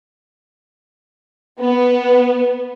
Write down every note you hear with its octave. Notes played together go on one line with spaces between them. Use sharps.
B3